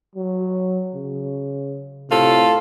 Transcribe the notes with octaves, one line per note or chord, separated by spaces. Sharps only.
F#3
C#3
A2 C3 F4 A4